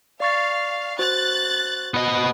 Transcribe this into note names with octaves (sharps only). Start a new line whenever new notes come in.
D5 F5 C#6 A6
F#4 C5 F#6 A6
B3 D#5